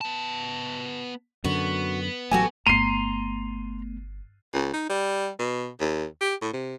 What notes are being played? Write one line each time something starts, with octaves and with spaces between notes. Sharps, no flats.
B3 A5
F#2 D3 B3 F#4
A1 F#3 A3 F#4 G4 A4 G#5
G1 A3 B3 A#5 C6 C7 D#7
C#2
D#4
G3
B2
D#2
G4
A2
C3